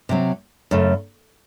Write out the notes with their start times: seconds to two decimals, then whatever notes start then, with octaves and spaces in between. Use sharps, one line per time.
0.09 C3 F#3 C4
0.71 F#2 C#3 A3